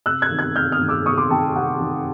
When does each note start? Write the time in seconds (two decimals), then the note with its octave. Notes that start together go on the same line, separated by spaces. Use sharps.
0.06 C3 E6 F#6
0.22 F#6 G#6
0.31 D#3
0.39 F#6 G#6
0.56 C3 F6 G6
0.72 D#6 F6
0.81 D#3
0.88 D6 E6
1.06 C3 C#6 D#6
1.18 C6 D6
1.31 D#3 G5 A5
1.56 C3 F#5
1.81 D#3